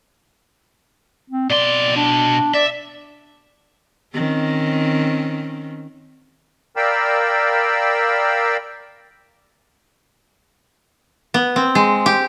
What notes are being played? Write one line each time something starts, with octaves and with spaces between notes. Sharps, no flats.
C4
B2 D5 C6
D4
D5 E5
D#3 C4 C#4
A#4 D5 F5 G5 B5 E6
B3
C4
G#3
G4